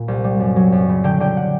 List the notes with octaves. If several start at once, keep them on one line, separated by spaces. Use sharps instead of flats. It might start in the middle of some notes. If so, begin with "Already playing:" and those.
Already playing: A#2
C2
G3
F#2
F#3
F#2
C#3
D3 G5
D3 G5
F#5